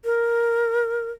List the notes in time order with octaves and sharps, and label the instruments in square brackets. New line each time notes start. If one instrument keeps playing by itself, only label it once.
[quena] A#4